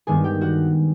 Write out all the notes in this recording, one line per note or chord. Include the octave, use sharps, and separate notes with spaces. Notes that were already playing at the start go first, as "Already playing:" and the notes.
G2 D#3 G#3 B3 D4 G#4 G#5
G4 G5
F#4 F#5